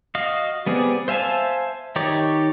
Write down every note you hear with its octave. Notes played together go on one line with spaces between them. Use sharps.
F#4 D#5 F5
G3 B3 C4 G#4 D5
C5 E5 F5 G#5 A5
D#3 D#4 G4 C#5 D5